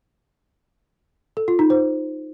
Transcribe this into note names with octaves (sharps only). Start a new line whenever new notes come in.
A4
F4
D#4
C5